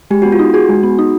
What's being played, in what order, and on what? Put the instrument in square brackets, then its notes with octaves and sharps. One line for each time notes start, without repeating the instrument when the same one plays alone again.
[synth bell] G#3 [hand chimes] G4
[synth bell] B3 [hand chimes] F#4
[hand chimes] F4
[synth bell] D#4
[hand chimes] F#4 [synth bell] G#4
[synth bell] G#3
B3
D#4